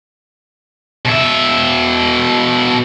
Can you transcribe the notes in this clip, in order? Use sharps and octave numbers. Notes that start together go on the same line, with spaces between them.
B2 E5